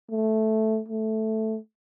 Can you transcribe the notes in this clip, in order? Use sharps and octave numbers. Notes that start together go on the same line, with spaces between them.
A3
A3